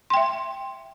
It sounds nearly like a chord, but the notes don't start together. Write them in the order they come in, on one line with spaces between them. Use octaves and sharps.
C6 G5 E5